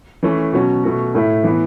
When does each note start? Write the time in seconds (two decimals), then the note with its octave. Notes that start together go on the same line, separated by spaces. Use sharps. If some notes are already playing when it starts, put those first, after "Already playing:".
0.23 E3 A3 C#4
0.53 B2 F#3 C#4 F#4
0.84 B2 A3 F#4
1.15 A2 A3 E4
1.44 E3 B3 E4